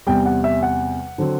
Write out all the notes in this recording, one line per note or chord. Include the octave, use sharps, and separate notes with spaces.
E2 C3 G3 G5
F#5
E5
F#5
D3 F#3 C4